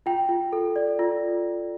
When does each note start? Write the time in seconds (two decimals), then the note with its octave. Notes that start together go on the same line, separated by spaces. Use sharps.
0.06 F4 G5
0.29 F4
0.53 A4
0.76 D5
0.99 F4